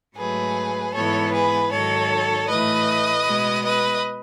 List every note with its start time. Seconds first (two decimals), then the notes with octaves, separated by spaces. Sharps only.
0.16 G#2 F#3 A3 G#4 B4
0.94 G#2 E3 G#3 B3 A4 C#5
1.32 G#4 B4
1.71 G#2 D#3 F#3 A4 C#5
2.47 A2 E3 A3 B4 D#5
3.25 B2 G#3 B3
3.64 B4 D#5